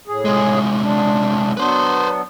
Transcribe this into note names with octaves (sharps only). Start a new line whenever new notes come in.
A2 G#4
C2 G#3
D4
F#3 B3 D4 B4 C5